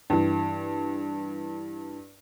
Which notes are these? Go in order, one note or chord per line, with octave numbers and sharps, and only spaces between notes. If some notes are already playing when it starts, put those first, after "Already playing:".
G2 E3